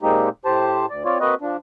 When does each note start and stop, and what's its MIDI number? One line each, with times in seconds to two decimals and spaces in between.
0.02 0.29 46
0.02 0.29 56
0.02 0.29 58
0.02 0.29 60
0.02 0.29 63
0.02 0.29 67
0.45 0.86 45
0.45 0.86 67
0.45 0.86 72
0.45 0.86 81
0.90 1.04 38
0.90 1.04 74
1.05 1.18 60
1.05 1.18 65
1.05 1.18 73
1.05 1.18 74
1.20 1.35 58
1.20 1.35 60
1.20 1.35 66
1.20 1.35 71
1.20 1.35 75
1.41 1.57 53
1.41 1.57 62